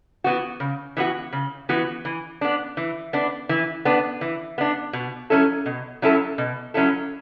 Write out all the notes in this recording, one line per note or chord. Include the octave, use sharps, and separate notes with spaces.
E3 B3 F#4
C#3
E3 B3 F#4
C#3
E3 B3 F#4
E3
B3 D4
E3
B3 D4
E3
B3 D4
E3
B3 D4
B2
F#3 C#4 E4 A4
B2
F#3 C#4 E4 A4
B2
F#3 C#4 E4 A4